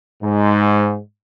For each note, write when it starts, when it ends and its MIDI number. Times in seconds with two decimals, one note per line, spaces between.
0.23 0.98 44